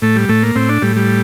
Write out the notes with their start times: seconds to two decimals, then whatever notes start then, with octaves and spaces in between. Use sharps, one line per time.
0.02 A2 A3
0.16 G3
0.29 A2 A3
0.43 A#3
0.55 A2 C4
0.69 D4
0.82 A2 G3
0.96 G3